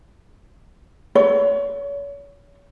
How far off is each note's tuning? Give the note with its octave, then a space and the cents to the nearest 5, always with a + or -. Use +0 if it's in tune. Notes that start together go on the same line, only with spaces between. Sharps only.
C#5 +35